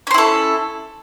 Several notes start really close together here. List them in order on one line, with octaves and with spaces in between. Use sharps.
C#4 C5 E4 A4